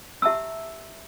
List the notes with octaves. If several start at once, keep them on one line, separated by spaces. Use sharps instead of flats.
G4 E5 A5 A#5 E6